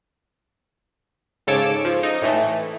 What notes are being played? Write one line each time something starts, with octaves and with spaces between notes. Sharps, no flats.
G#2 C#3 A4 C#5 D6 E6
F3
D#4
A2 E3 A3